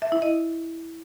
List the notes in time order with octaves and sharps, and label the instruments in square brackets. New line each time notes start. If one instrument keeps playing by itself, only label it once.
[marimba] E5
E4
D#5